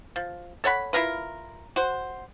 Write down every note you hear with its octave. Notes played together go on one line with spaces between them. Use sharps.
F3
A4 C#5 F#5 B5
E4 F4 A#4 B4
F#4 C5